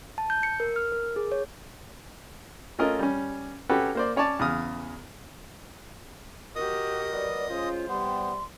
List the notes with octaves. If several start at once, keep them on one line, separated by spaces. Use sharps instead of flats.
A5
G6
C#7
A#4
F6
A#4
G#4
C#5
A3 C#4 F4 A#4 D#5
G3 C#4
C#4 F#4 G4 A4 B4
A#3 C5 D5
C#4 C#5 D5 A5
E2 C#3 D#6 F6
F#4 G4 A#4 D#5 D#6
F#3 B4 D5
G#3 C#4 F4 C5
C3 G3 B3 C6